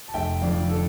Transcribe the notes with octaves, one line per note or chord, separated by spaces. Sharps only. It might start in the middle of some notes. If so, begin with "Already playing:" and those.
A5
F1 E5 G5
F2 D3 F3 D5 F5
A4